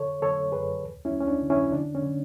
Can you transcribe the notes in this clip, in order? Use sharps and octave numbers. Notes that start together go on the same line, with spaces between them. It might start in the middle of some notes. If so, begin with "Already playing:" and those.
Already playing: D3 A4 C#5
D3 A4 C#5
F#2 G#4 B4
D2
C#4 E4
D2
C#4
D4
D3
C#4 E4
D3 D4
C#4
D3